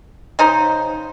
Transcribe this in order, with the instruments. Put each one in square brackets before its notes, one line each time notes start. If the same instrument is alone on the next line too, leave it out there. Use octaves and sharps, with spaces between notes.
[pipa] C#3 D#4 C5